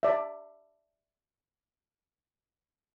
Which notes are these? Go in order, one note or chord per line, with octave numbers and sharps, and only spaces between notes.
D5 E5